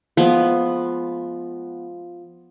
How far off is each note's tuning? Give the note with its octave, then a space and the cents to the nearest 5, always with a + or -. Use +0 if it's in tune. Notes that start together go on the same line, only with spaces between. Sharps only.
F3 +0 G#3 +35 B3 +0